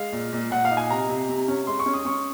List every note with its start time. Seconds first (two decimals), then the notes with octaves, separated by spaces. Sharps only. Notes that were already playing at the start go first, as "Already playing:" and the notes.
Already playing: G#3 F5
0.12 A#2
0.33 A#2
0.51 A#2 F#5
0.65 F5
0.71 D#4
0.77 G#5
0.91 C3 A#5
1.09 C3
1.29 C3
1.48 C#4
1.67 G#3 C6
1.79 C#6
1.86 C#4
1.93 D#6
2.05 C#4 C#6